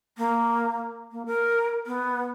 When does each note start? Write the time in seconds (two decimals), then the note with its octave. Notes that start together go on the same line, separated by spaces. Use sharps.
0.18 A#3
1.12 A#3
1.26 A#4
1.87 B3